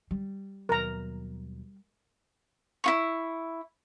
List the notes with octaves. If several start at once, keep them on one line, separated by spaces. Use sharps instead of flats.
G3
D#2 B2 F#3 A#4 A#5
E4 F4 C#6